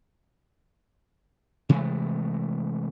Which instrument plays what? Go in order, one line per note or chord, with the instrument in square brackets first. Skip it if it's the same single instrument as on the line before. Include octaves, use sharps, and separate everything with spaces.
[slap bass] C3 E3 G#3 A3